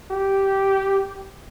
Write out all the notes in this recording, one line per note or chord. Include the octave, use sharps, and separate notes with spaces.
G4